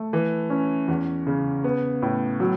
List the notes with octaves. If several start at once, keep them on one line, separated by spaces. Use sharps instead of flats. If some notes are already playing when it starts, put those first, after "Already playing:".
Already playing: A3
E3
C#4
E2
C#3
B3
A2
F#3